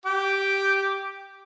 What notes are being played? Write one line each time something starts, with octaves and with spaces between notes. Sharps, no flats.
G4 G5 D6